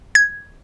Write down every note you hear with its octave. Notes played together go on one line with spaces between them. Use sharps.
G#6